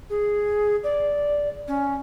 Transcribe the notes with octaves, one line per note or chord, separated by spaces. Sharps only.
G#4
D5
C#4